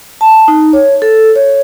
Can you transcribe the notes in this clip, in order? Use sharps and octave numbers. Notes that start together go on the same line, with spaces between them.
A5
D#4
C#5
A4
C#5